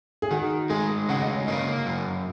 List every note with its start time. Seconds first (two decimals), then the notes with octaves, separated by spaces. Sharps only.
0.22 G#4
0.31 D#3 F#4
0.70 G#3 G#4
1.09 C#3 F#5
1.22 D#5
1.34 C#5
1.47 A#3 D#5
1.86 F#2